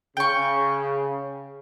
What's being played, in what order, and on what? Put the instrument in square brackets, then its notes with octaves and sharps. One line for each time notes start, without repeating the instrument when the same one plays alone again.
[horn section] C#3 [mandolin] G5 C#6